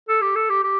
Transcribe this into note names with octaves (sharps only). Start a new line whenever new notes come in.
A4
G4
A4
G4
G4